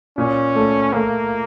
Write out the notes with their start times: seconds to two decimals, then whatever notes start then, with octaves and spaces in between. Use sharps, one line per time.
0.17 A#2 C#4
0.55 A3
0.93 A3 A#3